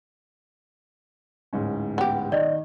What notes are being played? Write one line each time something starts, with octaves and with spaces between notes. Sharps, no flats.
D1 G#2 C#4
B3 G4
D#3 D5 D#5